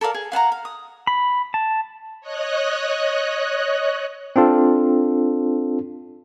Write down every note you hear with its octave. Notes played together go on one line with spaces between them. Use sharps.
A4 A#4 D5 F5
G#4
F5 F#5 A5 A#5
F5
D#6
B5
A5
C#5 D#5 F#6
C4 D4 F4 A4